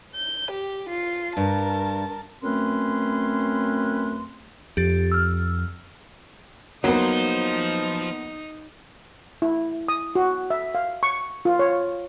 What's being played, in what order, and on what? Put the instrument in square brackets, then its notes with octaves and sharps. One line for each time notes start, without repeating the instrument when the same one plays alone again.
[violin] G6
G4
F4 C7
[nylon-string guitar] G2 [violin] A#4 A5
[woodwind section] F#2 A3 C4 C#4 B4 C6
[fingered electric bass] F2 [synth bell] G4 A6
[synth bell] E6 F6
[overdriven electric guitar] F3 C5 [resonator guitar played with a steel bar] F#3 [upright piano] A#3 B3 [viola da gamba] D#4
[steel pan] E4
D#6
F#4
E5
F5
C#6
F4
C#5